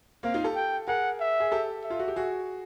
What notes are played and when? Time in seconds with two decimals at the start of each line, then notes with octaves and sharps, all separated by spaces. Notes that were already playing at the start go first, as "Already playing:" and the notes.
0.23 A#3 C4 F5
0.34 D#4 F4
0.44 G4 A4
0.55 G5
0.88 G#4 A#4 F#5
1.20 E5
1.40 G#4
1.52 G4 A4
1.84 E5
1.90 F4
1.99 F#4
2.08 G4
2.16 F#4 G#4